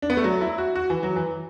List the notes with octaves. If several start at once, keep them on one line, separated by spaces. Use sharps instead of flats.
D4
B3
A3
F#3
E4
F#4
F#4
E3
F#3
E3